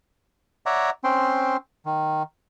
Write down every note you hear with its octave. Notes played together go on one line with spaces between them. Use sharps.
C#5 D5 E5 F#5 A#5
C4 C#4 G5 C6
D#3